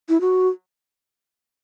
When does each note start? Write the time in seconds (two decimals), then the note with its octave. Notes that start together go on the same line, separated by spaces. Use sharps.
0.09 E4
0.21 F#4